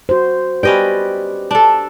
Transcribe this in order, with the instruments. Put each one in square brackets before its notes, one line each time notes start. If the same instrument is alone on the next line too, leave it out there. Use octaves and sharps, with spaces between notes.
[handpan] F#4 C5
[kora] C#4 D#5 G5 [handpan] G4 B4 D5
[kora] D4 A4